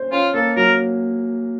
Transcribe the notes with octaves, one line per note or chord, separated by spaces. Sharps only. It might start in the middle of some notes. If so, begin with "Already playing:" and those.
Already playing: C#4 C5
C#4 F4
A#3 A4
F#3 A#4